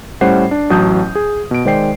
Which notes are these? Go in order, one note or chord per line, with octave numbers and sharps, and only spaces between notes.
A2 G3 C#4 C5 F#5 C7
D4
A1 F#3 A5 D#6 G6
G#4
B2 D7
D#3 G#3 C5 D5 G5 C7